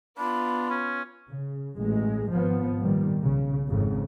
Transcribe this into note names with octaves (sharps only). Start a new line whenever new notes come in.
B3 D4 F4 B5
C#4
C#3
A1 G#3
G#1 F3 B3
A#2 D#3 G3
B1 C#3
G#1 F2 G#2 C#3